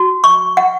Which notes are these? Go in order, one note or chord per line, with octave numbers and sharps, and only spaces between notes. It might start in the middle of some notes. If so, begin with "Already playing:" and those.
Already playing: F#4
C#6
F#5